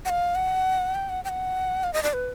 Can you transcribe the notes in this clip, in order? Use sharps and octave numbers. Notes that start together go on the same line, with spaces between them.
F#5
F5
F#5
G5
F#5
G5
F#5
F5
D#5
D5
B4